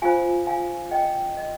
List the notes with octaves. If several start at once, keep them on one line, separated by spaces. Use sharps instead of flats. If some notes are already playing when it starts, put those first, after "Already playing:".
F4 C5 F5 G#5
F5 G#5
D#5 G5
D5
D#5